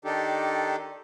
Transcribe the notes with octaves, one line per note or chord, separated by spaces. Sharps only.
D#3 D4 D#4 G4 A4